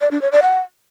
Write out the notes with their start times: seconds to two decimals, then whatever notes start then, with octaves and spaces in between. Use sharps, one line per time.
0.01 D5
0.11 D4
0.22 C#5
0.32 D5
0.42 F#5